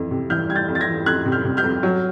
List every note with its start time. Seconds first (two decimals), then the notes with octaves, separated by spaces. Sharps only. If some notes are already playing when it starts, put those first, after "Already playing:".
Already playing: F2 E3
0.11 C3
0.30 E3 F6 G6
0.49 G3 G#6
0.55 G6 A6
0.68 F2
0.75 A6
0.81 G#6 A#6
0.87 E3
1.06 F2 F#6 G#6
1.26 C3
1.32 F6 G6
1.45 C3
1.57 F6 G6
1.64 F2
1.83 F#3